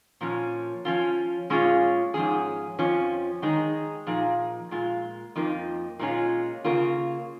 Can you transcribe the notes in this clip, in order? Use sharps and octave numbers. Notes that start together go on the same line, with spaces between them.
A#2 F3 C#4
F3 C#4 F4
A#2 G#3 C#4 F4 G#4
G#2 F3 C#4 G#4
F2 F3 C#4
D#3 G#3 D#4 G#4
A#2 F3 A#3 D#4 G#4
A#2 G#3 F4
F2 F3 A#3 D#4
A#2 G#3 C#4 F4
C#3 A#3 F4